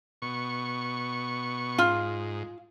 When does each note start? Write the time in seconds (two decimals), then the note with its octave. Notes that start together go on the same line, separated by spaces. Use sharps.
0.22 B2 C#6
1.78 G#2 F4